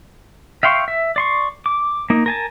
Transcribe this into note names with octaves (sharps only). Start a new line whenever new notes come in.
E5 F5 G5 C6 C#6
E5
D5 C6 C#6
D6
A#3 D#4
A#4 G#5 A5